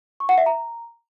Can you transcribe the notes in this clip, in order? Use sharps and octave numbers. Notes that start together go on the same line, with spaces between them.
C#6
F#5
E5
A#5